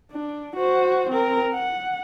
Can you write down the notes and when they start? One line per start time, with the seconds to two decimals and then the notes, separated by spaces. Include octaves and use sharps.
0.11 D4
0.56 F#4 C5
1.09 C4 A#4
1.54 F#5